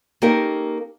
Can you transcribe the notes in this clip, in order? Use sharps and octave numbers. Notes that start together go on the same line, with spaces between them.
A#3 C#4 D#4 G4 A4 A#4